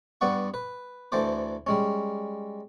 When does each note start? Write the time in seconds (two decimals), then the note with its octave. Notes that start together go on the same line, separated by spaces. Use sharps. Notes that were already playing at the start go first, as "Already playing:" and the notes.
0.21 G2 B3 D5 F#5 C#6
0.54 B4
1.12 D2 D3 E3 A4 C5 D6
1.67 G3 G#3 C#4